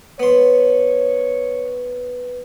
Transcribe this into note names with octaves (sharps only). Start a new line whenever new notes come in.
B3 C#5 C6